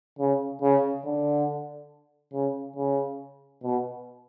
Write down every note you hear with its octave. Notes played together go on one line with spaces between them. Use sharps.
C#3
C#3
D3
C#3
C#3
B2